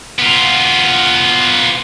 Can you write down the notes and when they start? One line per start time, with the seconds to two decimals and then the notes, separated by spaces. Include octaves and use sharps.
0.19 B3 F4